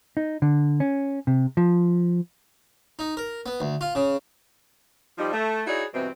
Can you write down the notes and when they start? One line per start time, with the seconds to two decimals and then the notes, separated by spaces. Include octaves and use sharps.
0.17 D#4
0.42 D3
0.80 C#4
1.27 C3
1.57 F3
2.99 D#4
3.17 A#4
3.46 B3
3.60 D2
3.81 F4
3.95 C#3
5.18 F3 G3 D#4
5.33 A3
5.66 D#4 E4 F#4 G#4 C#5 D5
5.94 G2 B2 E3 C4